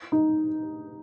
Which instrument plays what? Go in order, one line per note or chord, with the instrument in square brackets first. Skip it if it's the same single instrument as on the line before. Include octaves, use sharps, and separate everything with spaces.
[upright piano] D#4